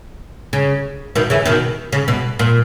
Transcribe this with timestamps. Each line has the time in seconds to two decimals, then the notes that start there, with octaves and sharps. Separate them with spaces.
0.53 C#3
1.15 B2 D#3
1.30 C#3 E3
1.46 B2 D#3
1.93 C#3
2.08 B2
2.39 A#2